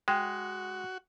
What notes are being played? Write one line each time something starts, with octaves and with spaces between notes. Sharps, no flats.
G#3 F#4 G5